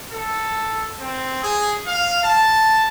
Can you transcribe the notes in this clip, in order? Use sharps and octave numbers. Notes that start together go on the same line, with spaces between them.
A4
C4
G#4
F5
A5